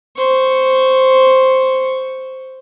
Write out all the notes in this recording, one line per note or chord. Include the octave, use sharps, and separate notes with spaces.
C5 C#6